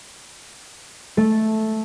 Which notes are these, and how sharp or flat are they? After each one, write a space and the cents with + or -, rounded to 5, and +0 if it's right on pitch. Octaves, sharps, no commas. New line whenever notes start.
A3 -10 A4 +0